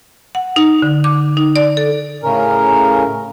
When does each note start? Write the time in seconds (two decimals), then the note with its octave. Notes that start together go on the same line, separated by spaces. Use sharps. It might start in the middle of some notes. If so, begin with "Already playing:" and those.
0.35 F#5
0.56 D#4
0.82 D3
1.04 D6
1.37 D#4
1.56 D5
1.77 A4
2.23 A2 C#3 C#4 A#4